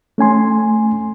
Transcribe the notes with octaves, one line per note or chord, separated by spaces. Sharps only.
A3 C#4 G#5 C6